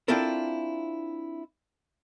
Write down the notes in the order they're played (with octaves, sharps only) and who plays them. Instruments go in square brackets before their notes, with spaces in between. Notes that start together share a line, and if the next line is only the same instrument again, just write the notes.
[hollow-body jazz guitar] C4 D4 E4 F4 A4 A#4